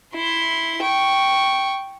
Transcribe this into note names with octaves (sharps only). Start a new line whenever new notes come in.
E4 C6
G5 C#6